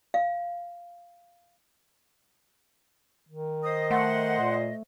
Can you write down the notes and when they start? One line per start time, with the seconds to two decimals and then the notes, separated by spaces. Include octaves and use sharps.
0.14 F5
3.29 D#3
3.63 C5 D#5 D#6
3.91 A3 F#5 C6
4.40 A#2